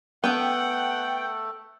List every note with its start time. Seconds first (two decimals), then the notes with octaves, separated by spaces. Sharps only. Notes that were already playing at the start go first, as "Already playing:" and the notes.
0.24 A3 B3 A4 F#5 G5